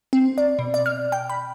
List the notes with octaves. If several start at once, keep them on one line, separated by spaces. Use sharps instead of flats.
C4
D5
B2
D5
F6
G5
B5